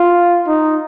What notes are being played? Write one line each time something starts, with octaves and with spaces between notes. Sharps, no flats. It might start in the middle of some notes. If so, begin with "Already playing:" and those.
Already playing: F4
D#4